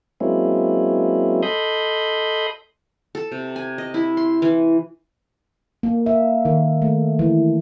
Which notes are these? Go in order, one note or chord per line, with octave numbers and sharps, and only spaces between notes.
F#3 G#3 A#3 C4 C#4 E4
A4 D#5 B5 C6 D#6 G6
A4
C3
G#5
D#5
E4
C6
E3
A#3
E5
D#3
A3
E3